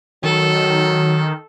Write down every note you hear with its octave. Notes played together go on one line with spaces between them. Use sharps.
D#3 F#3 A4